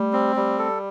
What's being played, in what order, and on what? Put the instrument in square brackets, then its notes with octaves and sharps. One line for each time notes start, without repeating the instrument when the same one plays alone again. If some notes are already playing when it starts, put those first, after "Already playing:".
Already playing: [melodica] G3 [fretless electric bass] A3
[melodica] C4
G3
A4